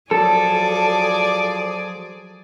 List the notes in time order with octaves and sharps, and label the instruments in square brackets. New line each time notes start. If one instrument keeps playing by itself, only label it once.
[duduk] F3 [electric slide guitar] F#3 [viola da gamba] G#4 D5 [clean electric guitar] A4